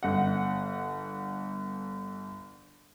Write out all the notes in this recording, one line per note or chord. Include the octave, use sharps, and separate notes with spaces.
G1 F#5